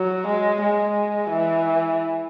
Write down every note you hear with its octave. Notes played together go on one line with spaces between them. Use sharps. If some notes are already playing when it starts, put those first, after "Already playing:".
Already playing: F#3
G#3
G#3
E3